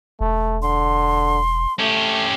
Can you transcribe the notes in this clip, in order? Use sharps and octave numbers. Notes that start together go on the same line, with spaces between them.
E1 A3
D3 C6
A3 C#4 G4